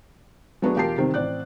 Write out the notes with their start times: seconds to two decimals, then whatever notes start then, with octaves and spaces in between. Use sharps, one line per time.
0.62 F#3 G#3 A3 B3 D4 F#4
0.75 E1 F4 G4 A#4 A5 C7
0.98 C3 D#3 G3 C4
1.14 A1 C4 D5 F#6